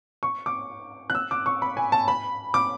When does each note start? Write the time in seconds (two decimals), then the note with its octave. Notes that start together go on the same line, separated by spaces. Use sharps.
0.23 C#6
0.46 D6
1.10 F#6
1.15 E6
1.31 D6
1.46 C#6
1.62 B5
1.77 G#5
1.92 A5
2.08 B5
2.54 D6